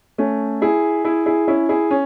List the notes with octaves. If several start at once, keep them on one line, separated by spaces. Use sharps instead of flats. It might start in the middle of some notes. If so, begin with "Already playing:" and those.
A3 C#4
E4 G#4
E4 G#4
E4 G#4
C#4 E4
E4 G#4
C#4